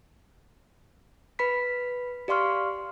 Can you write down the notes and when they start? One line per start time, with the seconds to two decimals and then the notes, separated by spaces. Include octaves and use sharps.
1.39 B4 B5 B6
2.28 G4 D5 F5 C6 C#6 F6